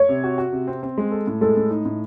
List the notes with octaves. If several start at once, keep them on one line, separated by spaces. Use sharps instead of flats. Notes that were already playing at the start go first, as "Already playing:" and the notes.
Already playing: C#5
C3
F#4
F#4
C3
C4
C4
G#3
A4
A2
G#3 A4
A2
D#4
A2